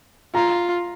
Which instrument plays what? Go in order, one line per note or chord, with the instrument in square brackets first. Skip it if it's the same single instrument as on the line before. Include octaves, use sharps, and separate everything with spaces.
[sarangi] F4 [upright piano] A#5